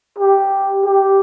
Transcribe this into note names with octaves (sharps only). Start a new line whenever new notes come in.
G4
G4